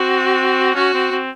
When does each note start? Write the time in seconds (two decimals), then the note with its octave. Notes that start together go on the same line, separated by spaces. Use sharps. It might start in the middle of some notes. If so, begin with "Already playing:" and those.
Already playing: C4 F#4
0.75 C#4 F#4
0.94 C4
1.11 C4